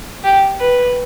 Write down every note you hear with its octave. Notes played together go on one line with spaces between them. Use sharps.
G4
B4